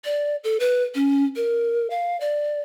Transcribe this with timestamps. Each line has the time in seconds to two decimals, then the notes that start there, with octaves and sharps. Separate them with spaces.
0.05 D5
0.44 A4
0.60 B4
0.95 C#4
1.36 A#4
1.90 F5
2.21 D5